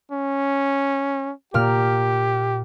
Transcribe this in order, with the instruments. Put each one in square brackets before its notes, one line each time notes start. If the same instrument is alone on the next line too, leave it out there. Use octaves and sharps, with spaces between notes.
[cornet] C#4
[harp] A#2 A#3 F6 [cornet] G4